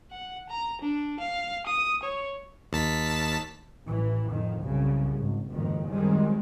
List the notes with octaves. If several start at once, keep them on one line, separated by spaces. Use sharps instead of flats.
F#5
A#5
D4
F5
D#6
C#5
D#2 A5 B6
A1 E3
F2 A2 D#3
C2 F#2 C#3
G#1
F#1 F2 G#2 D#3
F#2 D#3 G3 G#3 C4